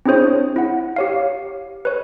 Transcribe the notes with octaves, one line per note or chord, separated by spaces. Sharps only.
C4 D4 E4 G#4 C5 C#5
E4 F#5
G4 C#5 F5
B4 C#5